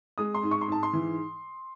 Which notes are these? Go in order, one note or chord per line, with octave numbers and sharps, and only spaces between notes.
G#3 D#6
C6
G#2
C#6
C6
G#2 A5
C6
E3